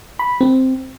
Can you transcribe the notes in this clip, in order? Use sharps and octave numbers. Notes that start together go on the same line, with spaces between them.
B5
C4